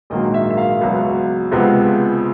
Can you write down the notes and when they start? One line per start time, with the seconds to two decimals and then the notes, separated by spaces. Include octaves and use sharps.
0.10 A#1 G#2 D#3 F#3 A#3 D#5
0.34 E5
0.50 E5
0.57 F5
0.81 C#2 B2 F#3
1.52 C#2 C3 F3 G#3 B3